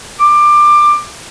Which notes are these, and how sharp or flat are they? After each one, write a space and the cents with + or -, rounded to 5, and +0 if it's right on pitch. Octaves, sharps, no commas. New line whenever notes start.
D6 +20